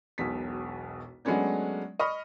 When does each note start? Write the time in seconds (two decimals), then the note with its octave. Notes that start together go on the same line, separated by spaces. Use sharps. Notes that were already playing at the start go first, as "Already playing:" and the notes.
0.18 E1 B1 B2 B6
1.25 F#3 G#3 A3 B3 C#4 D4
1.99 D#5 B5 C#6 F6